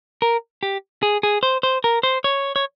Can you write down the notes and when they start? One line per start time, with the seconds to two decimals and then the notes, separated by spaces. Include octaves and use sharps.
0.22 A#4
0.63 G4
1.03 G#4
1.23 G#4
1.43 C5
1.63 C5
1.84 A#4
2.03 C5
2.24 C#5
2.56 C#5